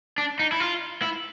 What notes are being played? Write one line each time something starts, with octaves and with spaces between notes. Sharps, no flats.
D4
D#4
E4
F4
E4